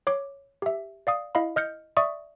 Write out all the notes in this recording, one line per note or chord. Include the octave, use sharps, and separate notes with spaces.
C#5 D6
G4 E5
D5 F5 D#6
E4 D#5 F5 B5
D#5 F6 G6 C#7
D5 E5 C#6 D#6